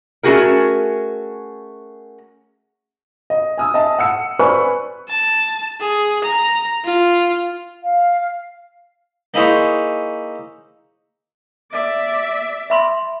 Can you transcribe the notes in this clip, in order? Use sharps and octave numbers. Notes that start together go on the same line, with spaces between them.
A3 C#4 F4 F#4 G#4 A#4
D#5
G#5 D#6 E6
D#5 E5 A5
F#5 E6 C#7
B4 C5 D5 G#5 B5 C#6
A5
G#4
A#5
F4
F5
A#3 D#4 E4 G#4 C5 C#5
D5 E5
E5 B5 C6